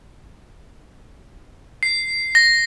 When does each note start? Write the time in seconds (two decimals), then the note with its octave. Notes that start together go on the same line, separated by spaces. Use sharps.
1.83 C7
2.35 A#6